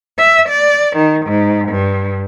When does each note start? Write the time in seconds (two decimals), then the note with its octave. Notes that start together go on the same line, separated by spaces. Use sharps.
0.17 E5
0.48 D5
0.96 D#3
1.25 G#2
1.68 G2